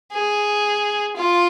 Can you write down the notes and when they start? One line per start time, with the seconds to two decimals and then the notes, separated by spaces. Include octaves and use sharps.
0.13 G#4
1.16 F4